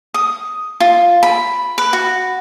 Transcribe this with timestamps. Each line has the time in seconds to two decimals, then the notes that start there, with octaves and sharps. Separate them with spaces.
0.14 D#6
0.80 F4
1.23 B5
1.78 B4
1.93 F#4